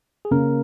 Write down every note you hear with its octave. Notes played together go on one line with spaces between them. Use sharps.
G#4
C#3 A#3 A#4